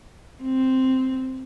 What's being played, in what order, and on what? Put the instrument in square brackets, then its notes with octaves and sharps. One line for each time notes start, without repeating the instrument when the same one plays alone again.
[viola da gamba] C4